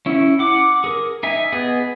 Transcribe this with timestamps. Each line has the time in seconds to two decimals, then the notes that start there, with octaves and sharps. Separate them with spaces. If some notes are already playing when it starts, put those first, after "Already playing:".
0.06 C#4 E4
0.39 F#5 D6
0.84 G#4 A#4
1.23 D#4 E5 G#5
1.52 B3 G#4 D#5